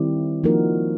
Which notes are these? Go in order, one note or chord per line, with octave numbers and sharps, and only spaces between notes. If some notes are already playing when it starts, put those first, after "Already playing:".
Already playing: D#3 G3 C4 E4 G4
F3 A#3 D#4 F#4 A#4